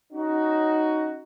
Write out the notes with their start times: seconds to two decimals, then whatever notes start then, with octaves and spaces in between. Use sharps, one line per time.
0.13 C#4 D#4 F#4